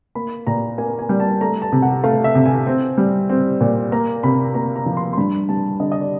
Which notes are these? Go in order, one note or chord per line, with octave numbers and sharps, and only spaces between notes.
A#3 B5
A#2 A#5
A#3 G#5
G#5
G3
A5
A3 A#5
A5
C3
F#5
A3 F5
E5
C3
G#5
C4
G3
C4
A#2
A#3 A#5
C3 B5
A#3 A#5
A#5
F3
C6
C6
G2 B5
G3 A5
D3 D#5
D#5
D5